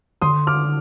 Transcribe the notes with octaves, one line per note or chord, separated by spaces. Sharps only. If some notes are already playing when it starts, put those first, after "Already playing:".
D3 C6 D#6
D6 F6